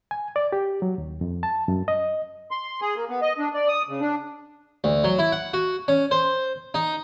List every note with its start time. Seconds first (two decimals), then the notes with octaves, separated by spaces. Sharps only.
0.11 G#5
0.36 D5
0.52 G4
0.82 F#3
0.98 D#2
1.21 F2
1.43 A5
1.68 F#2
1.88 D#5
2.51 C6
2.81 G#4
2.96 A#3
3.09 B3
3.22 D#5
3.38 D4
3.54 D5
3.68 D#6
3.88 C#3
4.01 D4
4.84 D2
5.04 F#3
5.19 E4
5.32 F#5
5.53 F#4
5.88 C#4
6.11 C5
6.74 D#4